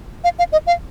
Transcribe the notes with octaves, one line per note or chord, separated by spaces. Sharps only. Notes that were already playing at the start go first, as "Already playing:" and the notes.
F5
F5
D#5
F5